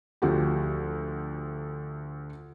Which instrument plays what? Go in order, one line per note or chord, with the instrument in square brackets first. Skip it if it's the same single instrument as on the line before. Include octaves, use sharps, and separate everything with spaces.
[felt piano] D2 F3 F#4 G4